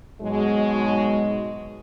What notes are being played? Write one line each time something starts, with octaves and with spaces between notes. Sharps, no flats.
G#2 B2 F#3 G#3